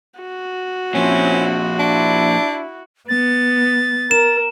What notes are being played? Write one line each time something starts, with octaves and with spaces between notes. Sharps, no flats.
F#4
A#2 F3 C4 C#4 E4
D4 E4
B3 A6
A#4 E7